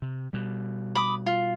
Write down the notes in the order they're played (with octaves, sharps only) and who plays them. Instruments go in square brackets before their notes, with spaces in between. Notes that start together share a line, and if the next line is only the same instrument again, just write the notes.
[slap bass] C3
B2 G3
[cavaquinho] B5 D6 D#6
F4